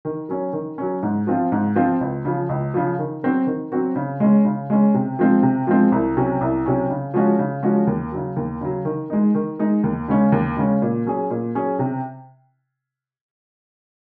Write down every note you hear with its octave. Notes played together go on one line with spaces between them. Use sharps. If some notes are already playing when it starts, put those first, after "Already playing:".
D#3
F#3 C#4
D#3
F#3 C#4
G#2
F3 C4 F4
G#2
F3 C4 F4
C#2
C#3 F3
C#2
C#3 F3
D#3
F#3 C4 F#4
D#3
F#3 C4 F#4
C#3
G#3 C#4
C#3
G#3 C#4
C3
F3 G#3 C4
C3
F3 G#3 C4
C2
C3 F#3 C#4
C2
C3 F#3 C#4
C#3
F3 G#3 C#4 F#4
C#3
F3 G#3 C#4 F#4
D#2
C#3 F#3
D#2
C#3 F#3
D#3
G#3 D#4
D#3
G#3 D#4
D#2
C#3 G#3 C#4
D#2
C#3 G#3 C#4
A#2
F#3 C#4 G#4
A#2
F#3 C#4 G#4
C3